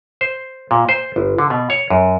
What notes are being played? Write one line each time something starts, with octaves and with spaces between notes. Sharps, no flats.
C5
A#2
C5
G1
D3
B2
C#5
F#2